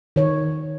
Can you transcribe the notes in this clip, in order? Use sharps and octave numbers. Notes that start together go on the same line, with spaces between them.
D#3 C#5